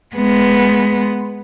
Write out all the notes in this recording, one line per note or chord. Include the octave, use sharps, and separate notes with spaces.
G#3 B3